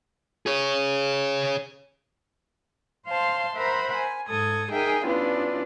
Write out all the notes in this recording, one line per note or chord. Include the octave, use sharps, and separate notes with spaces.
G#4 C#5
C5 F5 A5 C6
A#4 C5 E5 F#5 A#5 B5
G#5
G#2 A4 D#6 G#6
D#4 G#4 A#4 E5 G5 G#5
G2 B3 C#4 D4 E4 F4